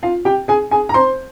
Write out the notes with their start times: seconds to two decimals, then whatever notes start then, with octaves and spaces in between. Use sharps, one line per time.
0.03 F4 F5
0.25 G4 G5
0.48 G#4 G#5
0.71 G#4 G#5
0.89 A#5
0.94 C5 C6